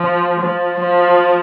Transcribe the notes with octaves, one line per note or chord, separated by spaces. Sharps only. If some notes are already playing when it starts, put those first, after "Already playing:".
Already playing: F3
F3
F3